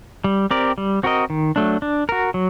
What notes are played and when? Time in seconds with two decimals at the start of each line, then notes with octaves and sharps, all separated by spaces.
0.24 G3
0.51 C4 G4 A#4 D5
0.78 G3
1.03 C4 F#4 A#4 D#5
1.30 D#3
1.56 F#3 A3 D4
1.82 D4
2.09 F#4 A#4
2.34 F#3